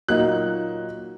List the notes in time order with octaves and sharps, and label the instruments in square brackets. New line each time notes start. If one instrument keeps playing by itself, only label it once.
[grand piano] A#2 F#3 A#3 D#4 F#6